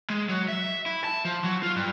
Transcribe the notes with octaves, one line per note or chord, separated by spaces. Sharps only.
G#3
F#3
E5
E4
A5
F3
F#3
F4
G2